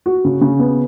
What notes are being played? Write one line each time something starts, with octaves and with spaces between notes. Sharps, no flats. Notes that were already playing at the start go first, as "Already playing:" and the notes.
F#4
C#3
C#3
B3